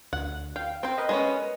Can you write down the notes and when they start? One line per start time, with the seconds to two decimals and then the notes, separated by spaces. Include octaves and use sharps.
0.13 D2 F#5
0.56 F5 G5
0.83 C4 C5 G5
0.98 A#4 B4 D#5
1.09 G#3 B3 C#4